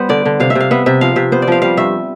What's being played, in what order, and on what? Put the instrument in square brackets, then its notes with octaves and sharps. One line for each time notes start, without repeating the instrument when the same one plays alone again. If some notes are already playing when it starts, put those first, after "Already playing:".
Already playing: [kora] G3 B3 C5
D3 D5
D3
C3 F5
E5
C3
F5
B3 E5
C3 E5
F3 F5
C3 E5
B3 C5
D5
F3 F5
G3 F5
G2 E5